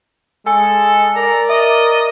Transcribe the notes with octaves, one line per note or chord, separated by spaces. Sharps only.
G#3 A4 G#5
A#4 D5 A#5
D#5 E5